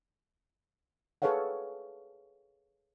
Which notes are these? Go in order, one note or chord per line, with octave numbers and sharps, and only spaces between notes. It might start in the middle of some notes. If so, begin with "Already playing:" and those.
G#4 A4 B4 C#5 F5 F#5